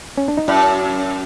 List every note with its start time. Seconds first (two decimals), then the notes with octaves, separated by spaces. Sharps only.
0.18 C#4
0.28 D4
0.37 D#4
0.48 F#2 E4